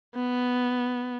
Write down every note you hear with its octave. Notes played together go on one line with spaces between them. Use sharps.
B3